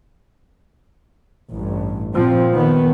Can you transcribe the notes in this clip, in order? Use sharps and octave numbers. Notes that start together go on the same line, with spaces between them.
A1 G2
A#2 F3 C4
D#3 B3